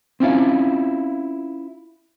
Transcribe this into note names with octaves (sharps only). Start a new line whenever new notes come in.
C4 C#4 E4 F4